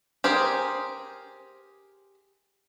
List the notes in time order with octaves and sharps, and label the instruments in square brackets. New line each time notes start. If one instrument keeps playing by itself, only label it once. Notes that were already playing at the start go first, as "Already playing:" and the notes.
[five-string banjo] G4 G#4 A#4 C5